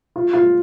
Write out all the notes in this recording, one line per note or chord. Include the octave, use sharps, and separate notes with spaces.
F4
F4